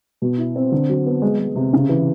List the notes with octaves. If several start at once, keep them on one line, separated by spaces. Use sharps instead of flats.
B2
E4
C4
D3
F#3
B3
G#3
G#3
C3
C#3
E3